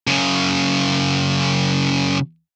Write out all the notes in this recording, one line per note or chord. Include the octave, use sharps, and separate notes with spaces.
F#2 C#3